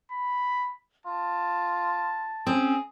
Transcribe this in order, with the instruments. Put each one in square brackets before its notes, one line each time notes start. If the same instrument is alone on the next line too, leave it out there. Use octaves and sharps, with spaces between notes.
[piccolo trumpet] B5
[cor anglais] F4 [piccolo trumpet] A5
[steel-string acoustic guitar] C4 C#4 [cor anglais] G#4